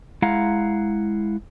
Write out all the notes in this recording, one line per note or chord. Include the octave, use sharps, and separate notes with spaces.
G#3 E4 F5 F#5 A#5